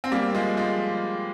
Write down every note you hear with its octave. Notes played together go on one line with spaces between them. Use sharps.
C4
G3 A#3
F3 G#3
F3 G#3